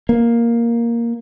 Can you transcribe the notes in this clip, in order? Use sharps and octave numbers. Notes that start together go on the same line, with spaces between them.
A#3